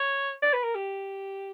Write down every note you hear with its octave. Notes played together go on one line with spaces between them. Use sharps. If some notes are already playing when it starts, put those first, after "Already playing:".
Already playing: C#5
D5
B4
A#4
G4